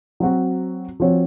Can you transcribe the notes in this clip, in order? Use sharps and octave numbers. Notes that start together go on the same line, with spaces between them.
F#3 C4 F#4
F3 C4 F#4 C#5